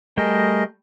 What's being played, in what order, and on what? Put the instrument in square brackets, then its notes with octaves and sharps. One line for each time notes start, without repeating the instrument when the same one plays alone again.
[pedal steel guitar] G3 A3 G5 [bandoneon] G#4 A#4 D#5